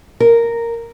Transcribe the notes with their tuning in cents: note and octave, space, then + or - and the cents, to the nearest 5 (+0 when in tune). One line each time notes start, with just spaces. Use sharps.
A#4 -5